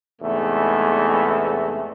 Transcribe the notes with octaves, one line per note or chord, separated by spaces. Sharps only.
E2 G#2 C3 A3